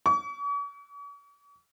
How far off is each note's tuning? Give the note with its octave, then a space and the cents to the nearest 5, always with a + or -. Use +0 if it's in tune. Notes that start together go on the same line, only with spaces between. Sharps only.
C#6 +45